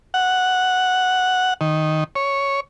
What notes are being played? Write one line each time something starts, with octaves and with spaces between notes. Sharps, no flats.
F#5
D#3
C#5